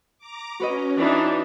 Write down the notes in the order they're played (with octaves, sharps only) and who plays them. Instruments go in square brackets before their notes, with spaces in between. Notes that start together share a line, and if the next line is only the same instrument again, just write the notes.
[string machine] A#5 D6
[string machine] C#4 [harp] F#4 B4 D#5
[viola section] E3 D4 D#4